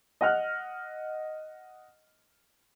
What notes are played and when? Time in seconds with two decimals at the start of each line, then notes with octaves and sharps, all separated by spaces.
0.21 D#5 F#5 F6 F#6